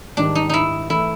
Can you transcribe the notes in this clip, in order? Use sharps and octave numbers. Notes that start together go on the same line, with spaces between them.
G#2 D#3 G3 D4
D#4
D#4 E4
E3 A3 E4